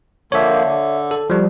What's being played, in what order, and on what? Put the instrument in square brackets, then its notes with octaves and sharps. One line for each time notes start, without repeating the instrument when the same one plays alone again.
[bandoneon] D3 F3 A#3 [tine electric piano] C#5 E5
[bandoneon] D3
[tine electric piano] A4
F3 G3